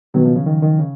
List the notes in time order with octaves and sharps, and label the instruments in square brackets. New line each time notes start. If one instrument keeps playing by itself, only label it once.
[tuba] B2 [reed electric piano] D#3 F#3
[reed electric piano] C#3 F3
C#3
D#3
D#3
C#3